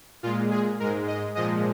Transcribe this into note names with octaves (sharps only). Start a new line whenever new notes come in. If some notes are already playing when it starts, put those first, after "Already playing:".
A#2 G#3 F4
G#4
G#2 G#3 A#4
D#5
A#2 F3 G#3 D#5